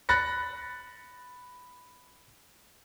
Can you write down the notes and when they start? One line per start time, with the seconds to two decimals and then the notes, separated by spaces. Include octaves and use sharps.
0.09 B5 F#6 A6 A#6 C#7